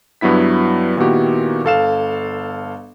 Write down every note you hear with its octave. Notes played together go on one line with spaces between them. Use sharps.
G2 F#3 B3 E4 B6
A#2 D#3 B3 E4 F#4 G4
G1 A4 F5 E7